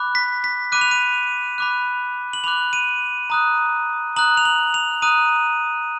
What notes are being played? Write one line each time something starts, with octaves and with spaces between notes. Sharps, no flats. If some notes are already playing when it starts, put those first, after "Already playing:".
Already playing: B5 D6 F#6
B6
B6
B5 D6 F#6 D#7
F7
D#7
B5 D6 F#6
F#7
B5 D6 F#6 F7
D#7
A#5 D#6 F#6
A#5 D#6 F#6 F#7
F7
F#7
F7
A#5 D#6 F#6 D#7